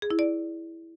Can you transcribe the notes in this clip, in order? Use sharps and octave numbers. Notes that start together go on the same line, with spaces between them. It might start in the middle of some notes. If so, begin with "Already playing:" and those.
G#4
E4
D5